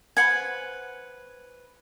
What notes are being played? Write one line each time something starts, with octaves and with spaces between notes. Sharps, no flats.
B4 C5 F#5 G#5